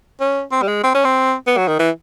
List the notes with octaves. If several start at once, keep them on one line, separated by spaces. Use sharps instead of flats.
C#4
C4
G3
G#3
C4
C#4
C4
B3
F#3
D#3
E3